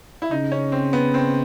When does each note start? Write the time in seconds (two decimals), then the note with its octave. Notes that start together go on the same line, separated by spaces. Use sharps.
0.22 E4
0.30 C#3 D#4
0.52 C#4
0.72 C4
0.93 B3
1.14 C4